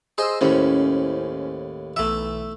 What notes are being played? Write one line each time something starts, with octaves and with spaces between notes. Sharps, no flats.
G#4 C5 D#5 C6 E6
D#2 A2 C#4 E4 C5
B1 E3 A3 E5